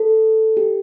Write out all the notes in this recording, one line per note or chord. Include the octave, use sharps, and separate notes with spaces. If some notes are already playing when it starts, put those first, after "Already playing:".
Already playing: A4
G4